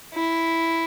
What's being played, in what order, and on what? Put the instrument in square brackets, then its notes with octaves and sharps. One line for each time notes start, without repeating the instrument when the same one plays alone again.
[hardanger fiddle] E4